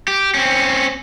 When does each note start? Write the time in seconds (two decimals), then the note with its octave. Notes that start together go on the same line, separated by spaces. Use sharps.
0.08 G4
0.34 C4 C#4